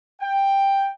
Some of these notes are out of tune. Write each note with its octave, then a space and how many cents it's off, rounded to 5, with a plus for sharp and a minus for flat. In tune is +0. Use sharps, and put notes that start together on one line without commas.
G5 +10